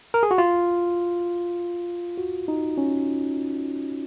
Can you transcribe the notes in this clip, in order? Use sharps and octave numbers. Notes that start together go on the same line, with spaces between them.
A#4
G#4
F#4
F4
F#4
D#4
C#4